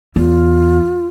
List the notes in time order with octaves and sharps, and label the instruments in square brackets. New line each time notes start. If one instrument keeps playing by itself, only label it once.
[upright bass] E2 [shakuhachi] F4